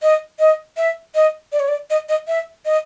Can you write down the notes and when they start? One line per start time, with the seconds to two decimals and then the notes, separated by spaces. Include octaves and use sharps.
0.02 D#5
0.39 D#5
0.77 E5
1.15 D#5
1.52 D5
1.60 C#5
1.68 D5
1.90 D#5
2.09 D#5
2.28 E5
2.65 D#5